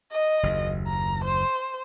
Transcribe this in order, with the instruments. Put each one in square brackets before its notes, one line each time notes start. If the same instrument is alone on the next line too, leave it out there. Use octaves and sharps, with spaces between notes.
[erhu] D#5
[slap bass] F#1 D#2
[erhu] A#5
C5